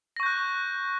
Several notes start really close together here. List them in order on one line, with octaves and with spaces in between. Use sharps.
A#6 C#6 G6 F#6